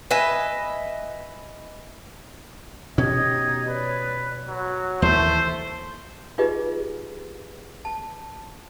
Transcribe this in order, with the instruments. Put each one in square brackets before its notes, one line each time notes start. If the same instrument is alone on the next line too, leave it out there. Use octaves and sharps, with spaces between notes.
[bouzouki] B4 D#5 E5 G#5
[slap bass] B2 C#4 [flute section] D#4 G4 G#6 [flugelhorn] D#5
[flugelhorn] B4 [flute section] C#5 D5
[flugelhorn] F#3 [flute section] F#4
[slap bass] D#2 E3 [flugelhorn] A3 [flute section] A4 E5 [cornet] C5
[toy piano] D#4 F4 G4 G#4 B4 D#5
A5